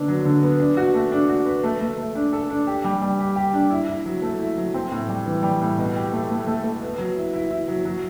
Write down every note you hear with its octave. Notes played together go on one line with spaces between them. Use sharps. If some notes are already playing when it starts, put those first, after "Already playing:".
Already playing: D3 B3 D4
F#3
D3
B3
D4
F#4
A3
D4
F#4
B4
A3
A3
A3
D4
A4
D4
G4
G3
G3
G4
G4
D4
E4
E4
F#3
A3
E4
F#3
C4
A2
G3
E3
G3
A2
B2
G4
A3
A3
A3
A3
B3
F#3
E4
E4
E4
F#3
F#3